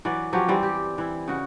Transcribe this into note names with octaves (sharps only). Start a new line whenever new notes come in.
E3 F#3 B4 D5
F3 F#3 C#4 G4
E3 G3 C4
G4
E3 E4
C#3 F#4